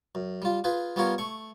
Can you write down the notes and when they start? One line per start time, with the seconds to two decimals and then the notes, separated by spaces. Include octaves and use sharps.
0.15 F#2
0.42 G3 F4
0.64 F4 G#4 B4
0.96 G3 B3 C#4 F4 A#4 C#5
1.18 A3 C#6